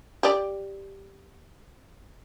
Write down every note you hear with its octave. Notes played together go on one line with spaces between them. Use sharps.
G4 D5